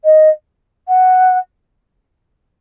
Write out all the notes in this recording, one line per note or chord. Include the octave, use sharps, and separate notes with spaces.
D#5
F#5